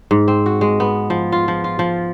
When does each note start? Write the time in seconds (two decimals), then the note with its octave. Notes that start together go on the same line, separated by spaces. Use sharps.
0.11 G#2
0.28 C4
0.46 F#4
0.61 G#3
0.80 B3
1.10 F3
1.32 F4
1.48 F3
1.64 F4
1.79 F3